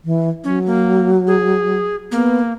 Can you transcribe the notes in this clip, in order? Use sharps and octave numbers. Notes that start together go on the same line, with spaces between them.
E3
F#3 C#4
A#3
G#4
A#3 B3